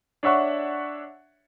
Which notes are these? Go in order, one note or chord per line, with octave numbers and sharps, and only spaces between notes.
D4 C#5 E5 F#5 C#6